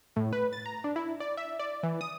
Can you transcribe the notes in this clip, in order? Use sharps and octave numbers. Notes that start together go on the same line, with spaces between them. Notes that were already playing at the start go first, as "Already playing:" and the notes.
A2
B4
A6
A#5
D4
E4
D5
E5
D5
E3
D#6